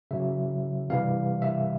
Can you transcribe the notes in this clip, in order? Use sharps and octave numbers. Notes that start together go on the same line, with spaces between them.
C#3 F#3 E5
C3 E3 G3 F5
E5